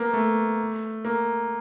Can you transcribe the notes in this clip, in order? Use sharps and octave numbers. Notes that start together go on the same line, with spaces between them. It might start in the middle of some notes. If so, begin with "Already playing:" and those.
Already playing: A#3 B3
A3
A#3